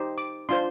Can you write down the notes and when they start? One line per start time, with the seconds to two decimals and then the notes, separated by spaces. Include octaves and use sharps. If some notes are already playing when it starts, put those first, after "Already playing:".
Already playing: D#4 G4 C5
0.18 D6
0.49 D4 F4 C5 C6